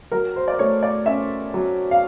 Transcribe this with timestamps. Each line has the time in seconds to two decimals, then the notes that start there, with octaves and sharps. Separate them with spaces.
0.11 F#3 A#4
0.36 C5
0.48 D5
0.59 A3 C#5
0.83 D5
1.06 C#4 E5
1.54 F#3
1.91 F5